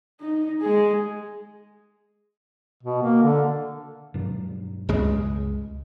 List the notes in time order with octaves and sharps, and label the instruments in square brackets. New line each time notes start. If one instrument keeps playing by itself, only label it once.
[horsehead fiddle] D#4
G#3 G#4
[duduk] B2
A#3
D3
[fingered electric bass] G2 B2 F#3
[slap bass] C#2 C#3 G#3